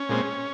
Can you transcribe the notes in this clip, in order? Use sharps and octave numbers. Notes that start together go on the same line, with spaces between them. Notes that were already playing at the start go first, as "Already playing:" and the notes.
Already playing: C#4
A#2 G#3 C4